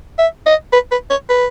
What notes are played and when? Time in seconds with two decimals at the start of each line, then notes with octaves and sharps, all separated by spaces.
0.19 E5
0.46 D#5
0.73 B4
0.91 B4
1.10 C#5
1.29 B4